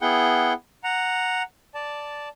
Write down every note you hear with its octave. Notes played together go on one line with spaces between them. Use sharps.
B3 E4 G#4 F#5 G5
F#5 A#5
D5 A5